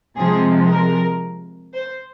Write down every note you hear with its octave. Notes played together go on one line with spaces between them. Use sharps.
C3 F3 G#3 G#4
A#4
C5